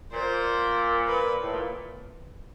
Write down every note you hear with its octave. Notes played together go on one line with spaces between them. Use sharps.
A#2 C5
B4
A2
A#2